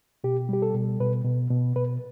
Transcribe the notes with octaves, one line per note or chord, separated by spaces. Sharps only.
B2 G4
G3 G4
A4
B2
B2 B4
B2
B2
B2 B4